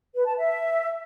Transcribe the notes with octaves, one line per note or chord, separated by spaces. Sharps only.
B4
A5
E5